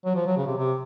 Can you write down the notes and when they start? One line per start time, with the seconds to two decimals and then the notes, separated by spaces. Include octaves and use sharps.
0.05 F#3
0.15 F3
0.26 F#3
0.37 C#3
0.47 C3
0.58 C3